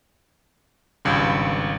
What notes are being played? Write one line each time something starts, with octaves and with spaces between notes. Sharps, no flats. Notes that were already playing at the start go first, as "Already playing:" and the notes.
G#1 C#2 G2